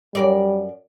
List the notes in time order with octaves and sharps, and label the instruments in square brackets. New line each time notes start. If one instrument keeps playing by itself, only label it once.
[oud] F#2 A#4 D5 [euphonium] G3